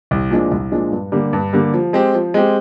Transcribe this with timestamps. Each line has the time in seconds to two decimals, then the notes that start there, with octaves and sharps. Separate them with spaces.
0.11 C2
0.31 A#2 F3 G#3 D4
0.51 C2
0.71 A#2 F3 G#3 D4
0.92 G2
1.12 D3 G3 A#3
1.33 G2
1.53 D3 G3 A#3
1.74 F3
1.93 G#3 C4 G4
2.15 F3
2.34 G#3 C4 G4